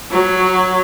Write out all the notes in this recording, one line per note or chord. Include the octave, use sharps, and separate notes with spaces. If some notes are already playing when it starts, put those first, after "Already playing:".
F#3